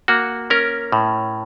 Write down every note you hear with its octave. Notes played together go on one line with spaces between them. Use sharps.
A#3 F#4
C#4 A#4
A2